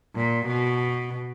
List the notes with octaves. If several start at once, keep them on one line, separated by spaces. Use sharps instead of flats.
A#2
B2